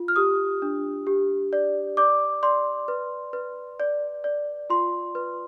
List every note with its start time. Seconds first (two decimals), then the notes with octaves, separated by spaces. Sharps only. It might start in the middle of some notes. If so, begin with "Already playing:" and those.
Already playing: F4
0.08 F6
0.16 G4 D#6
0.62 D4
1.07 G4
1.53 D5
1.97 D5 D6
2.43 D5 C6
2.88 B4
3.33 B4
3.80 D5
4.24 D5
4.70 F4 C6
5.15 B4